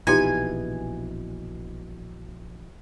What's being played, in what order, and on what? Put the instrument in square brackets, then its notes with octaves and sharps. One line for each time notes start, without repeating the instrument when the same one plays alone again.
[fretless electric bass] A#1 B2 E3 [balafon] D#4 F4 G4 [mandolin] G#5